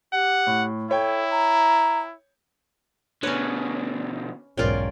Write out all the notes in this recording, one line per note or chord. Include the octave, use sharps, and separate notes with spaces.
G4 F#5
A2
E4 A4 C#5 G5
A#5
B2 D3 C#4 B4 C#5
B1 E2 G#2 C#4 F4 A#4 D5 G5